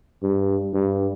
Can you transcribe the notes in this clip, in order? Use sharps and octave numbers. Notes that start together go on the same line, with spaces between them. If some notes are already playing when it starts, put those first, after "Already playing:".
G2
G2